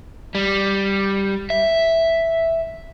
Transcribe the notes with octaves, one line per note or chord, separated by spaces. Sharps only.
G3
E5